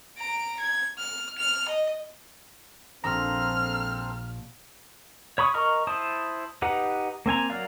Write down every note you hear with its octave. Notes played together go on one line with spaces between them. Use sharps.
A#5 D7
G#6
F6
F6 F7
D#5
A#1 A#2 C4 A4 C5 A#5 F6
C#5 B5 C#6 D#6
A#4 D#5 A#5 C#6 F6
E4 C5 A5 D#6
D#4 G4 B4 F#5
A#3 C4 G#5 A#5
F#3 A#4 D5 F5